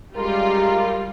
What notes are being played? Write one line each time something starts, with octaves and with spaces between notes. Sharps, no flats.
F#2 G3 G#3 F4 A#4